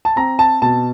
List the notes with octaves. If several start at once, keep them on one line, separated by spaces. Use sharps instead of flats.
A5
C4 A#5
A5
B2 A5